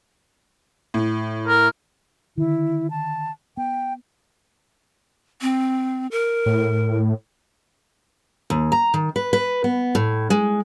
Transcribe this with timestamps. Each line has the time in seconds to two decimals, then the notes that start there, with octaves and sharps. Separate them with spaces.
0.94 A2
1.47 A#4
2.38 D3 D#3 E4
2.90 A5
3.57 B3 G5
5.42 C4
6.11 A#4
6.46 A2
8.50 D#2
8.72 A#5
8.94 D#3
9.16 B4
9.33 B4
9.64 B3
9.95 A2
10.30 G#3